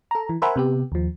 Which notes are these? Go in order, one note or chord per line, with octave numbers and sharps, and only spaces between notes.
A4 A#5
E3
A#4 C5 E5 F#5 G#5 B5
C3 B3 G4
D#2 F3